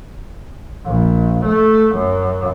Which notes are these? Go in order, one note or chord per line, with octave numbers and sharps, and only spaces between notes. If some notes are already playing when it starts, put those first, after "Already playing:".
A#1
A3
F#2